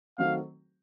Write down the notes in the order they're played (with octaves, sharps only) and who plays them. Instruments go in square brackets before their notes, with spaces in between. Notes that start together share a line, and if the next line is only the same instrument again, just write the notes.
[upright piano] D#3 F#3 A3 C4 [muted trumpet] F5